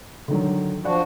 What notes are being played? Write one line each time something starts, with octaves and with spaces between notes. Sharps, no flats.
D3 D#3 F#3
F3 D4 F#4 D5 F#5